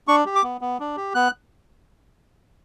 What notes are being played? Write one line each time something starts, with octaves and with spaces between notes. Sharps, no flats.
D4 C#6
G4
D6
B3
B3
D4
G4
B3 F#6